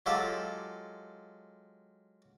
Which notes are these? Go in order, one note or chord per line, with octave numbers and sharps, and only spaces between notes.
F#3 G#3 F4 G4 A4